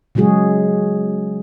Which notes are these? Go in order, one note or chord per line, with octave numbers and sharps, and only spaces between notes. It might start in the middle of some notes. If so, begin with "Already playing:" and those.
C#3 F#3 G#3 F#4 G#4